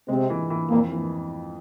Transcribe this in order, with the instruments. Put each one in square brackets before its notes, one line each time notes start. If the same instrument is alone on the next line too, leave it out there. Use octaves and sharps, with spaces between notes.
[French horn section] C3 C4 [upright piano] G#3
[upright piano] E3
E3
[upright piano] F2 [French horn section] A#2 A#3
[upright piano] E3